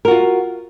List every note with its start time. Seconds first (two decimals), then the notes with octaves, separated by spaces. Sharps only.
0.05 A#4
0.08 F#4
0.11 F4